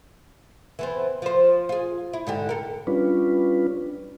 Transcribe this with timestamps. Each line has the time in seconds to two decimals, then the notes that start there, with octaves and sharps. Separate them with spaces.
0.79 E3 B3 C4
1.22 F3 C5
1.69 F4 G#4
2.13 E4
2.27 G#2 D3 G4
2.49 A4 A#4
2.87 G3 C#4 D4 F4 B4